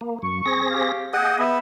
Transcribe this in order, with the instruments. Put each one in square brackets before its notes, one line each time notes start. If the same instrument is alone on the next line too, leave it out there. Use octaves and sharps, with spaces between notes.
[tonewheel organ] A#3
[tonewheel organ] F#2 [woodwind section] C#6
[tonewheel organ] C4 G#4 A#6
[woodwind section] G4 F5
[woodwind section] A#3 G5 [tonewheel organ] G#4 D#5 [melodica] F#5
[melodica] B3 [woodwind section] E5